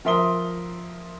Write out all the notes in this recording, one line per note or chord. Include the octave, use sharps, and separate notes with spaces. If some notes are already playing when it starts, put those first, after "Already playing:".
F3 A#4 E5 C6 D#6 G7